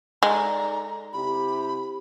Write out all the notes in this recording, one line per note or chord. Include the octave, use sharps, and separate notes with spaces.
G#3 D#4 A4 D5 A#5
C3 E4 G4 B5